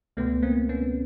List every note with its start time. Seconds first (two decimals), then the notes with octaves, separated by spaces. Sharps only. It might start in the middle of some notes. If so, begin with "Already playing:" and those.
0.17 C#2 B2 A3 B3
0.43 A#3 C4
0.69 B3 C#4